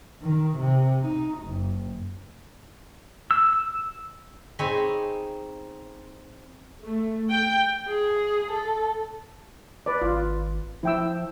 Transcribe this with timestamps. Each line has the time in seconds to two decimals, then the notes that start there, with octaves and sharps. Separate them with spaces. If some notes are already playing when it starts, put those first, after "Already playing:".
0.22 D#3
0.58 C3
1.06 D#4
1.39 F#1
3.31 E6
4.59 C4 D#4 G#4 C#5 G#5 B5
6.82 A3
7.30 G5
7.89 G#4
8.51 A4
9.86 B4 D5
10.01 G#1 F4
10.83 F3 E4 G5 E6